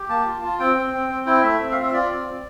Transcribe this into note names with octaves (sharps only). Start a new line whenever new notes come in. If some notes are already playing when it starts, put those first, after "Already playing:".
Already playing: G4
A#3 A5
F4
F4
C4 G5
C4
C4
C4
E4 G5
A3 E5
C4
F4 F5
E5
F4 D5
C4
C4